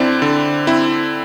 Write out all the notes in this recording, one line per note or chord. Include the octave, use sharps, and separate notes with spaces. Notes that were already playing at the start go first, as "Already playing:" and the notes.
Already playing: D3 C4 E4 D5
D3
C4 E4